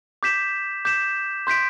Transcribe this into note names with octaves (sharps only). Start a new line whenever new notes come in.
D6 G6 B6 E7
D6 G6 B6 E7
C6 G6 B6 D7